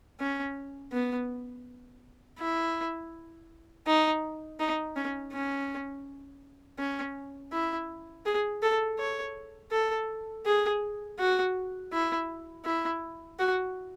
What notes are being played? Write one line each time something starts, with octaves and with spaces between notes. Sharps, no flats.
C#4
B3
E4
D#4
D#4
C#4
C#4
C#4
E4
G#4
A4
C#5
A4
G#4
F#4
E4
E4
F#4